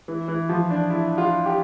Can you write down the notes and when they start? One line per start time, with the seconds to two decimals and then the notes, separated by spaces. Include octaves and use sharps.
0.08 E3
0.28 E3
0.49 F3
0.70 D4
0.90 E4
1.18 F4
1.46 G4